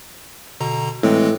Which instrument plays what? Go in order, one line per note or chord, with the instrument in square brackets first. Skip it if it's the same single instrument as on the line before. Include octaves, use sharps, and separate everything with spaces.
[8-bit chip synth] B2 D3 A#5
[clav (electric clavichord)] A2 [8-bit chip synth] E3 G#3 C4